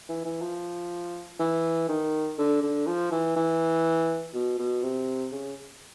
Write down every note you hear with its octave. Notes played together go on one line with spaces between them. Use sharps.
E3
E3
F3
E3
D#3
D3
D3
F3
E3
E3
B2
B2
C3
C#3